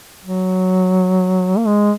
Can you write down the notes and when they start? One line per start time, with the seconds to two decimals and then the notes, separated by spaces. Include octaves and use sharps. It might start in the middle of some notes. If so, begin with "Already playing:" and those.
0.25 F#3
1.58 A#3
1.67 G#3